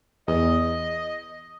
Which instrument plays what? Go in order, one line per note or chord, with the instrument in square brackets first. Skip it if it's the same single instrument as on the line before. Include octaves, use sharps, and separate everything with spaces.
[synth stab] E2 [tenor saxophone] D#5